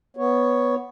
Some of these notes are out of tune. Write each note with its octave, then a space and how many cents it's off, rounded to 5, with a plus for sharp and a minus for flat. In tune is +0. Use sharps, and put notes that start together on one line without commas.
B3 +0 C#5 +0